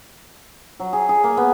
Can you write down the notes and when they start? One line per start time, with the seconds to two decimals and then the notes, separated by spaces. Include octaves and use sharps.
0.80 F#3
0.93 G#4
1.09 G#4
1.24 A#3
1.37 B3